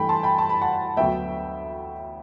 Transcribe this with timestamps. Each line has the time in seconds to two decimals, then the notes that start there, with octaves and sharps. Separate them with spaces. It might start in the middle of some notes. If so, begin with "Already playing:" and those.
Already playing: G2 E3 A3 G5 B5
0.09 A5 C6
0.23 G5 B5
0.38 A5
0.49 B5
0.61 F#5 A5
0.97 D2 D3 F#3 B3 E5 G5